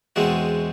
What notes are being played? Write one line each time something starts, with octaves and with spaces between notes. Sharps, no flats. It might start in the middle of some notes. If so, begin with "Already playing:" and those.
E2 B2 G#3 C4 F#4